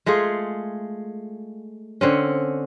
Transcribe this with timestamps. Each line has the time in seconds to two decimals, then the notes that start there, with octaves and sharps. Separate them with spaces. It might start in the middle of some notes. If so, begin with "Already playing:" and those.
0.06 G#3 A3 F4 G#4
2.01 D3 C4 C#4